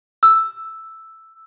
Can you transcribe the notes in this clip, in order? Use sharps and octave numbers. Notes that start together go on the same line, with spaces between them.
E6